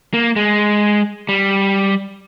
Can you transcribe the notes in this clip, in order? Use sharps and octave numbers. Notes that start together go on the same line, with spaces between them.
A#3
G#3
G3